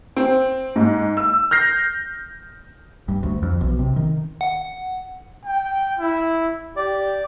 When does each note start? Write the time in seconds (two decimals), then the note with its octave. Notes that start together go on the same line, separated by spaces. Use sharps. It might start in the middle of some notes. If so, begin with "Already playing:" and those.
0.16 C4
0.76 G#2
1.17 E6
1.51 F6 G6 A#6 C7
3.08 G2
3.23 D2
3.43 F2
3.61 B1
3.79 C3
3.96 D#3
4.41 F#5
5.45 G5
5.99 E4
6.76 G4 D5